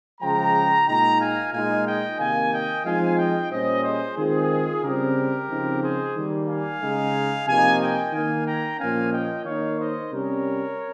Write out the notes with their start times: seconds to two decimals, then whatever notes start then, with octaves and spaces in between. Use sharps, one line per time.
0.21 C#3 F3 G#3 G5 A#5
0.87 A#2 G#3 D#4 G5 A#5
1.20 F5 G#5
1.53 A#2 G#3 D#4 F5 G#5
1.86 D#5 G5
2.19 C3 D#3 A#3 F5 G#5
2.53 D#5 G5
2.85 F3 G#3 C4 D#4 F5 G#5
3.18 D#5 G5
3.51 A#2 G3 C#4 C5 D#5
3.84 G#4 C5
4.17 D#3 G#3 C4 F4 G#4
4.83 C#3 G3 C4 G4 A#4
5.49 C#3 F3 C4 D#4
5.82 G#4 C5
6.15 D#3 G3 A#3
6.48 F5 G#5
6.81 C#3 G#3 D#4
7.47 C3 F3 A#3 D#4 F5 G#5
7.80 D#5 G5
8.13 D#3 A#3 D#4 F5 G#5
8.46 G5 A#5
8.79 A#2 F3 A#3 C#4 F5 G#5
9.12 D#5 G5
9.45 D#3 A#3 D#4 C#5 F5
9.78 C5 D#5
10.11 C3 G3 C#4 A#4 C#5